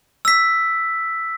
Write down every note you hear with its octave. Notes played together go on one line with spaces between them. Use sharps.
E6 B6